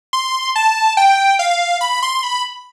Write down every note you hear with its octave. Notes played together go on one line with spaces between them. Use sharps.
C6
A5
G5
F5
B5
C6
B5